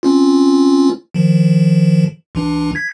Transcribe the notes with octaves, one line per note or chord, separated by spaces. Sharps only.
C4 C#4 F4
D#3 F3
C#2 E3 D4
G#6 B6